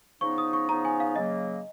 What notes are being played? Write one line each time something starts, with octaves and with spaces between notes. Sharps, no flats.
C#3 F3 B3 D#4 C#6
D#6
C#6
C#3 F3 B3 D#4 A#5
G#5
F5
C#3 F#3 A#3 D#5